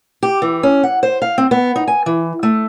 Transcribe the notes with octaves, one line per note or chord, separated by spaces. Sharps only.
G4
E3
C#4
F#5
C5
F5
C4
B3
D#4
G#5
E3
A3